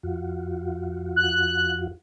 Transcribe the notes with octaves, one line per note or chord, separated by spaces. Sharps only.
F2 F4 F#4
F#6